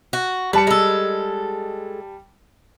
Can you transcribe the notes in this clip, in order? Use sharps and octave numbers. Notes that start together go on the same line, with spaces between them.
F#4
G3 B4 A5 C#7
G#3 A4